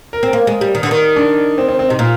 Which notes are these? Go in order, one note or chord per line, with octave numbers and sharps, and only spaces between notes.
A#4
C4
A#3
G#3
G3
D#3
D3
D#3
D4
C4
C4
C4
C3 D#4
A#2 F4